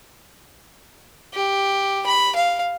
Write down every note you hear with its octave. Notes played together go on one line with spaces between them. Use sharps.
G4
B5
F5